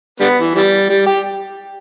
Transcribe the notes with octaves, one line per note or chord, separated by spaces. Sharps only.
D3 G3 B3
E3
E3 G3
G3
G4